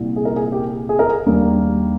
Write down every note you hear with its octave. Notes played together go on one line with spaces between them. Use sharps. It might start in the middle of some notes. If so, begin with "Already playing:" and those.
Already playing: C2 A#2 G3 A#3
G#4
A#4
G#4
G4
G#4
A#4
G#4
D#2 D#3 G3 A#3 D4